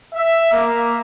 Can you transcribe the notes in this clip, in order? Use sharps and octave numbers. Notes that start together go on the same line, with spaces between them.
E5
A#3